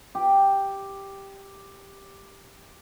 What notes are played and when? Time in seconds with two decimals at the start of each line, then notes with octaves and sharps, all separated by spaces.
0.15 G4